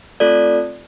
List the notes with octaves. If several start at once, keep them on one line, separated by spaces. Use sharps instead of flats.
A3 C4 F4 A4 D5